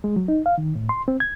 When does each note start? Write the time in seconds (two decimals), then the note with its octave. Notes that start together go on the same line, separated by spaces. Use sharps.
0.04 G#3
0.16 F#3
0.28 D#4
0.46 F5
0.58 D#3
0.75 A2
0.89 C6
1.08 C4
1.20 G#6